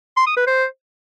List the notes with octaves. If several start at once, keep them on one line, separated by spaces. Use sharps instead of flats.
C6
D#6
B4
C5